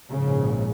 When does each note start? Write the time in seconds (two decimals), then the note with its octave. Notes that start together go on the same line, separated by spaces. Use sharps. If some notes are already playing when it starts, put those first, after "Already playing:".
0.10 A#1 G#2 C#3